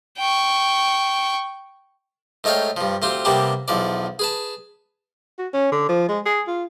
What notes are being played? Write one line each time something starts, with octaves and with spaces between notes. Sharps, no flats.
G5 C#6
G#2 A3 D#4 C#5 F5 G5
G2 F3
D2 C4 F4 G4
C3 G3 A#3 B3 D4 G4
B1 E2 F3 D5
G#4 B4 A5
F#4
C#4
D3
F3
G#3
G#4
F4